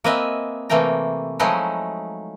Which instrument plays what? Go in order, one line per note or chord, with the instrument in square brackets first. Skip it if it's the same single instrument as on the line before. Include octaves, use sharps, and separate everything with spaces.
[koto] A#3 C4 B4 D#5 E5 G#5
C3 E3 A3 A#3 G5 A#5
F3 F#3 G#3 A3 D#4 E4